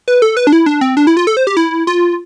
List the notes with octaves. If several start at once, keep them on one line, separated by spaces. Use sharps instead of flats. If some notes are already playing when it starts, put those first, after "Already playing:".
B4
A4
B4
D4
E4
D4
C4
D4
E4
F4
A4
C5
G4
E4
F4